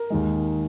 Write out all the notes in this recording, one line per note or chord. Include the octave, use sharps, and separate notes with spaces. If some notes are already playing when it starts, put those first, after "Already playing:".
Already playing: A#4
D#2 D#3 G#3